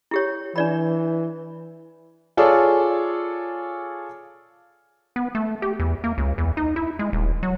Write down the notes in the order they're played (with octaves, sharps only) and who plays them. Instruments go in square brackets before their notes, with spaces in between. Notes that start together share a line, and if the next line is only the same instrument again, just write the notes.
[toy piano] E4 G4 C#5
[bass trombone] E3 [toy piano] D4 D5 B5
[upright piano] F4 G#4 A4 C#5 D5
[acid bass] B3
A3
G4
E2
A#3
C#2
E2
D#4
E4
G#3
D#1
F#3